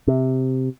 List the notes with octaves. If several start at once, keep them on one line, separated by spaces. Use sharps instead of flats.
C3